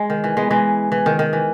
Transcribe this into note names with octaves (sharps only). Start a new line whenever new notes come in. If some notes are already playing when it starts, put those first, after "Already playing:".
Already playing: G#3
D#3
E3
G#3 B3
E3 G#3
E3
D#3
D#3
E3